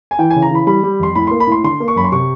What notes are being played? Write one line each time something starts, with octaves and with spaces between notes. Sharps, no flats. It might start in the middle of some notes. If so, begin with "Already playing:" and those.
G#5
E3 G5
G#5
C#3
A#5
E3 B5
G3 B5
G3
F2 C6
A2 B5
A#3 C6
B5
A2 C6
D3 C6
A#3
C#6
F#2 B5
C6
C3 C#6